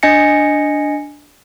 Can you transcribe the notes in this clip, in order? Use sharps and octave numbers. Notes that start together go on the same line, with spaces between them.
D4 D#5 G#5 A#6 C#7